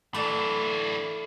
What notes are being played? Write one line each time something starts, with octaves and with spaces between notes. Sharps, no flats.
E3 A3 D4 D5 E5